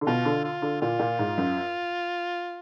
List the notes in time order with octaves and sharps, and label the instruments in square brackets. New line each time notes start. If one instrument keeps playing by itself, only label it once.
[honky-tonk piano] D3
[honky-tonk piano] B2 [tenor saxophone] F4
[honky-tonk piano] D3
[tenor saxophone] F4
[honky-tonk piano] D3
[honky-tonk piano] A#2 [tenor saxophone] F4
[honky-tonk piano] A#2
G#2
F#2